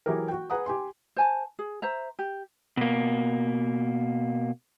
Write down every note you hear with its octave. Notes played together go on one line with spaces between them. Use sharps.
E3 F#3 E4 G4 G#4 A#4
F#4 G5
G#4 B4 F#5 A#5 D#6
G4 G#5 C6
C5 G#5 A5
G#4
C5 E5 A#5
G4
B2 A#3